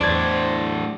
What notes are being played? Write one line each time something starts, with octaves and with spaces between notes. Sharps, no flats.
E2 A2 D4 C5 D5 G#6